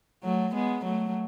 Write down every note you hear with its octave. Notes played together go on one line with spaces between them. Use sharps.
F#3 A3
G#3 B3
F#3 A3